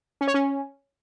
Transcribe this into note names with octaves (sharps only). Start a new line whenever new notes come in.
C#4
C#5
C#4